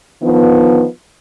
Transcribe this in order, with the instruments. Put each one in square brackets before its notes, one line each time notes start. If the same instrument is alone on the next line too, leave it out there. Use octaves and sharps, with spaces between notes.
[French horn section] D3 D#3 F3 B3